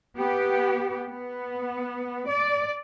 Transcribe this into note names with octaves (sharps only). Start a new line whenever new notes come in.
B3 G4
B3
D5